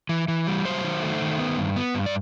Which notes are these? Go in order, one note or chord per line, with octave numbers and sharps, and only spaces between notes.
E3
E3
G3
F#3 C5
D#3
A3
D#3
B3
G2
B3
G2
D5